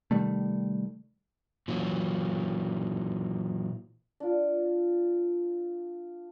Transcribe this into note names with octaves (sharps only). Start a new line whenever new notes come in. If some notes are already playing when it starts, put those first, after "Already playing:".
C3 D#3 G3 A3
A#2 E3 F#3
D4 F4